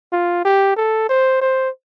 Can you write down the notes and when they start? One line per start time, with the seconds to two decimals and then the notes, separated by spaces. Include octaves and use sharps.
0.12 F4
0.45 G4
0.77 A4
1.09 C5
1.42 C5